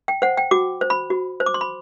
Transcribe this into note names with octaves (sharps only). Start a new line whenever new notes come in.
G5
C5 F#5
G5
F#4 D6
C5
B5
F#4
C5
D6
C6
B5